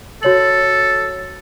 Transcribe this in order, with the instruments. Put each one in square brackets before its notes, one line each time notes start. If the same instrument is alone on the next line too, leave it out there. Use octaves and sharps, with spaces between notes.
[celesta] F#4 C#5 F#7 [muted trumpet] A4